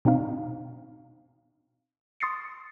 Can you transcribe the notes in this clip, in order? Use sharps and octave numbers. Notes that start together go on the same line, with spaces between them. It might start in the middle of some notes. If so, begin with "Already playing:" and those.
B2 C4 D4 D#4 F5
C6 D#6 A6 C7 C#7